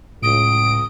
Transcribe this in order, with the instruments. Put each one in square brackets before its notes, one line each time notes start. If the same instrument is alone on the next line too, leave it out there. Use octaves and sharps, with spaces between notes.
[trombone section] C#2 [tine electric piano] A2 [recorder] D#6 [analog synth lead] D7